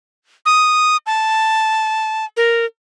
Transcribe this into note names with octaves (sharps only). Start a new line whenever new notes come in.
D#6
A5
A#4